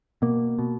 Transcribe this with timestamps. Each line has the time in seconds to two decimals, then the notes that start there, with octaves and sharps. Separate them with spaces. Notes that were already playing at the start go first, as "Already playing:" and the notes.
0.22 B2 A#3
0.59 B2